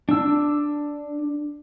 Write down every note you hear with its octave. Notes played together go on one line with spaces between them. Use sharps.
D4 E6